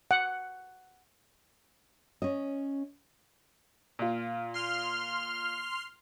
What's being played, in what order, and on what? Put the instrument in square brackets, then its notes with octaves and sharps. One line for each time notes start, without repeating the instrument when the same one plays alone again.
[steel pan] F#5
[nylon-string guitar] C#4 D#5
[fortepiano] A#2 F4
[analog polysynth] C6 F6